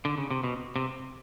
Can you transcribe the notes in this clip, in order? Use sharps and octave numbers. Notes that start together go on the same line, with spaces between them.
D3
C#3
C3
B2
C3